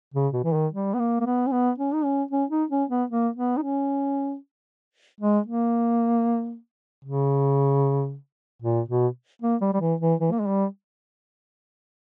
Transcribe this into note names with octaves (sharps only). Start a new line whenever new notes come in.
C#3
B2
E3
D#3
G3
B3
A#3
A#3
B3
C#4
B3
C#4
D#4
C#4
C#4
D#4
C#4
B3
A#3
B3
D#4
C#4
G#3
A#3
C#3
A#2
B2
A#3
G3
G3
E3
E3
E3
A#3
G#3
G3